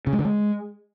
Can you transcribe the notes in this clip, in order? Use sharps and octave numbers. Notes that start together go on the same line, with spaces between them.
C#3
G#3
D3
G#3